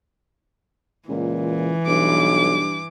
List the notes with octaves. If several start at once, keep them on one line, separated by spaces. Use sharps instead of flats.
C#2 A#2 E3
B1 G2 D6